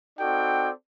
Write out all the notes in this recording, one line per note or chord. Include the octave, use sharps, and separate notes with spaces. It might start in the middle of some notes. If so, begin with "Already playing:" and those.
C4 D#4 F#4 A4 D5 G5